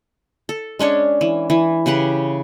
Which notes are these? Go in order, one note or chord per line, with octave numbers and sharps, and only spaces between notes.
A4
G#3 C#4 D4 C#5
E3
E3
C#3 G4 B4 F#5